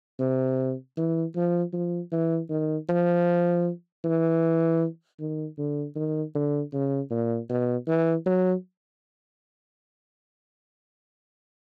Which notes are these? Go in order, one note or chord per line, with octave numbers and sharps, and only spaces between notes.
C3
E3
F3
F3
E3
D#3
F3
E3
D#3
D3
D#3
D3
C#3
A#2
B2
E3
F#3